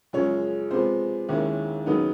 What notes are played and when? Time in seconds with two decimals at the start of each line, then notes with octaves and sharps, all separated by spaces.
0.13 F#2 C#3 F3 G#3 C#5
0.71 C3 F3 G#3 B3 C5
1.28 D#2 D#3 G#3 C#4 E4
1.86 D#2 C#3 F#3 B3 D#4